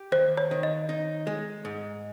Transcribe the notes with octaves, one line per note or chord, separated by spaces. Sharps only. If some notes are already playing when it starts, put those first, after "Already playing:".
Already playing: G4
D#2 C5
C#5
D#3
D#5
D#4
G#3
G#2